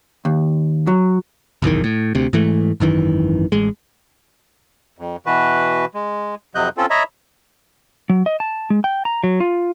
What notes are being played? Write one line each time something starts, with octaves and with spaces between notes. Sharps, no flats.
D#2
F#3
F#1 B1 E2 D#3
A2
D2 C3
G#2 E3 A3
G#1 F#2 D#3 E3
A1 G#3
F2
B2 E3 F#4 B4
G#3
F2 C3 F#3 D#5 F#6 G6
C4 C#4 F4 A4
C#5 D#5 E5 A#5 B5
F#3
D#5
A5
G#3
G5
A#5
F#3
F4